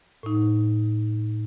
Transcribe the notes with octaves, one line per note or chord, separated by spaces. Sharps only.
A2 D#4